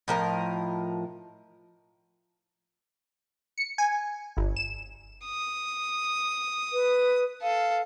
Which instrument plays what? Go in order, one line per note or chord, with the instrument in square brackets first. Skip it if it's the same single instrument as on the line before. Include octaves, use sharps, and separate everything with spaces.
[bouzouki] A2 F3 A#4 D#5
[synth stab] C#7
G#5
G1
E7
[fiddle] D#6
[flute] B4
[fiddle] A4 [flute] F5